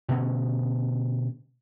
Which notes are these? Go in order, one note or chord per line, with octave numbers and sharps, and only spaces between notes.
B2 D3 B3 C#4